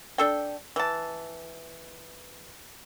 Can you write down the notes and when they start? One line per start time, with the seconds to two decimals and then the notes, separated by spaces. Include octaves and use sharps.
0.18 D4 A4 G5
0.76 E3 A5